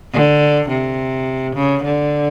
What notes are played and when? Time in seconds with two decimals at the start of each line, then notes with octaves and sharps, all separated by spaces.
0.13 D3
0.69 C3
1.56 C#3
1.83 D3